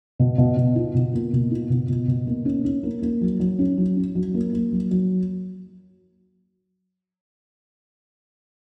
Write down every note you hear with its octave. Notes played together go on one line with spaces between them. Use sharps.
B2
B2
B2
F4
B2
A#3
B2
F4
B2
B2
B2
A#3
C#4
C#4
A#3
A#3
F#3
F#3
C#4
F#3
C#4
F#3
A#3
A#3
F#3
F#3